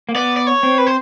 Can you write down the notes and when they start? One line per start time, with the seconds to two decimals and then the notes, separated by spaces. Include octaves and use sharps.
0.09 A#3
0.15 B3 D5
0.37 D5
0.47 C#5
0.63 C4
0.78 B4
0.87 C5